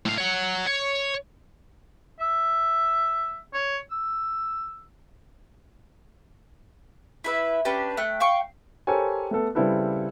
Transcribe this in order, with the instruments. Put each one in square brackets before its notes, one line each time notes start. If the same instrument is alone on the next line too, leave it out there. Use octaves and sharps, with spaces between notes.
[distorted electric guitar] A2 F5
C#5 F#5
C#5
[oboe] E5
C#5
E6
[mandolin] E4 B4 E5
C#4 D4 G4 B4
A3 G5 F#6
F5 G5 C#6
[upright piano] G4 A4 A#4 C5 C#5 G#5
A3 B3 A4
C#3 G3 C4 E4 A4 B4